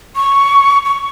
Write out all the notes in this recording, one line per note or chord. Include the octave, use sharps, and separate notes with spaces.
C#6
C#6